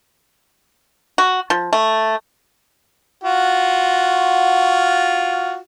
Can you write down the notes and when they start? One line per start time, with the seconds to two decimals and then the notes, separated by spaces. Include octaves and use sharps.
1.18 F#4
1.50 F3
1.73 A3
3.24 F4 F#4